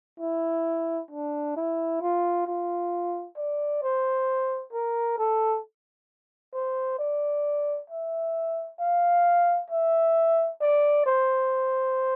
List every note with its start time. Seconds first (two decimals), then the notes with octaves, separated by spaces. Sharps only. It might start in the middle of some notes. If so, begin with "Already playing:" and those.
0.20 E4
1.11 D4
1.57 E4
2.02 F4
2.47 F4
3.37 D5
3.83 C5
4.73 A#4
5.18 A4
6.54 C5
6.99 D5
7.90 E5
8.80 F5
9.70 E5
10.61 D5
11.06 C5